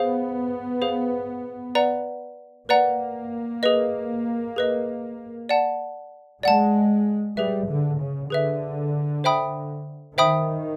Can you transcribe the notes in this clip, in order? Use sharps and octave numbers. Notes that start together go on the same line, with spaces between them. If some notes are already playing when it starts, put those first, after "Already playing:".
Already playing: B3 G#4 C5 F5
G#4 C5 F5
B4 D5 F#5 A#5
A#3 B4 D5 F#5 A#5
G#4 B4 D#5
G#4 B4 D#5
D5 F#5 A5
G#3 D5 F#5 A5
G3 G#4 B4 E5
D3
C#3
D3 G#4 B4 E5
C5 E5 G5 B5 D#6
D#3 C5 E5 G5 B5 D#6